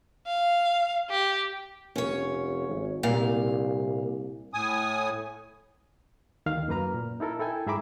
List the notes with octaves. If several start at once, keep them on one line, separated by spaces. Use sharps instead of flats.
F5
G4
F1 C#4 C#5
G#1
C2 A#2 F5
A2 G#5 D#6
D#2 D#3 F5 F6
F#2 A#3 B4 A#5 F6
A#2
D#4 E4 A4 A#4
E4 A4 G5 G#5
G#2 G#4 E5 A#5 B5 D6